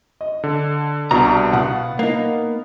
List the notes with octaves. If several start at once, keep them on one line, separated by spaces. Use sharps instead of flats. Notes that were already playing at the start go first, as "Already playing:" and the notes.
D#5
D3
C2 B2 D4 F#4 D5 A#5
B2 B3 F5 F#5
A#3 D#4